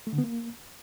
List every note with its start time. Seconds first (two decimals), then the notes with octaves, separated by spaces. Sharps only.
0.07 A3
0.13 D3
0.18 B3
0.24 A#3